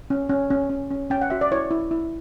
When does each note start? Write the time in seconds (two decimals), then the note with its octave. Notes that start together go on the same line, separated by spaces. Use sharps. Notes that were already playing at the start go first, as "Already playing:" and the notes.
0.10 C#4
0.29 C#4
0.50 C#4
0.70 C#4
0.91 C#4
1.10 C#4 G5
1.21 F#5
1.30 F#4 E5
1.41 D5
1.51 E4 C#5
1.71 E4
1.91 E4